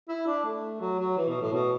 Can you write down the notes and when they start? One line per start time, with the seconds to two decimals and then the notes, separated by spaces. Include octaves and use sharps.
0.08 E4
0.27 D4
0.44 A3
0.81 F#3
0.99 F#3
1.17 E3
1.29 B2
1.41 A2
1.53 B2